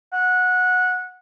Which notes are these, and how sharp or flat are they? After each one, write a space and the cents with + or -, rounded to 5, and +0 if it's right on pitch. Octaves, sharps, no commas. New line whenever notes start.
F#5 -15